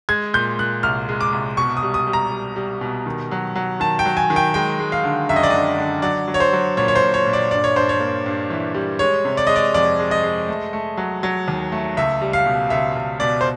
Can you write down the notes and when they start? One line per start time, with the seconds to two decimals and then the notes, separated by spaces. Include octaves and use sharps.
0.09 G#3 G#6
0.34 A#2 G6
0.59 A#2 F#6
0.83 C2 F6
1.09 G#3
1.21 D6
1.33 C2
1.57 B2 C#6
1.77 D#6
1.82 G3
1.94 D#6
2.07 G3
2.13 A#5
2.31 G3
2.56 G3
2.81 B2
3.06 D#3
3.31 F#3
3.56 F#3
3.80 D#3 A5
3.99 G5
4.05 F#3
4.17 G#5
4.30 D#3
4.36 G5
4.54 G#3 G5
4.80 G#3
4.92 F5
5.04 D3
5.29 F#2 E5
5.36 D#5
5.43 D5
5.50 D3 D#5
5.78 D3
6.02 F#3 D5
6.28 F#3
6.34 C#5
6.40 C5
6.53 F#3
6.77 A#2 C#5
6.88 C#5
6.95 C5
7.02 A#2
7.14 C#5
7.27 A#2
7.33 D5
7.51 G2 D5
7.64 C#5
7.76 G2 C5
7.89 C#5
8.00 A#3
8.26 G2
8.50 E3
8.74 G3
8.99 G#3 C#5
9.25 C3
9.37 D5
9.47 G#3 D#5
9.56 D5
9.74 F2 D5
9.99 G#3
10.11 D#5
10.23 G#3
10.48 A3
10.73 A3
10.97 F#3
11.23 F#3
11.48 D#2
11.72 A3
11.97 C#2 E5
12.21 G3
12.33 F5
12.46 B2
12.70 C#2 E5
12.96 C#2
13.20 B2 D5
13.41 C5